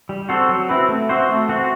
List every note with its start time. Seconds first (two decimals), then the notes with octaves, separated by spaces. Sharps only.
0.09 G3
0.29 C4 F#4 A4 C5
0.49 F#3
0.69 C4 E4 B4
0.89 A3
1.09 C4 F#4 C5
1.29 A3
1.49 C4 F#4